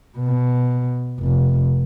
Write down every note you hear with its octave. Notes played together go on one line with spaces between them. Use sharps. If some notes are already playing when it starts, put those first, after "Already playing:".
B2
F1